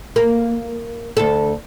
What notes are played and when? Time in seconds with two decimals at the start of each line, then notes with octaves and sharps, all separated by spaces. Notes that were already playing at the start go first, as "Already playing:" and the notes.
0.16 A#3
1.17 D2 A4